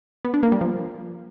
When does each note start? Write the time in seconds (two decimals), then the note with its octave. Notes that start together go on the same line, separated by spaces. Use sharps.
0.25 B3
0.34 D4
0.43 A#3
0.52 G3
0.61 F3